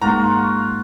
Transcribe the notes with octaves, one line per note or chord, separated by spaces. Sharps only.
G#2 A#3 F4 F#4 A#5